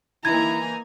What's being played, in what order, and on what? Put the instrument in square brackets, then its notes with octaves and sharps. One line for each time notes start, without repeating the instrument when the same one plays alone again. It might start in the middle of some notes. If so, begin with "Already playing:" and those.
[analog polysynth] E3 D#4 G#5 [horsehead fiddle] A#3 A#5 [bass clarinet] E4 [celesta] G#6